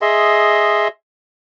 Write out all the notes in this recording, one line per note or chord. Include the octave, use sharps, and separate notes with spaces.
G#4 D#5 E5 C6